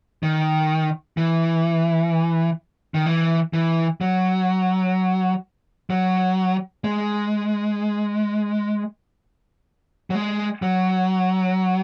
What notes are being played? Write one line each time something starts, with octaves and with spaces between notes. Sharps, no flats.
D#3
E3
D#3
E3
E3
F#3
F#3
G#3
F#3
G#3
F#3